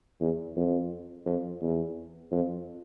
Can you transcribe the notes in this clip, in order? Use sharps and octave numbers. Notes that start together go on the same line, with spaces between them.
E2
F2
F2
E2
F2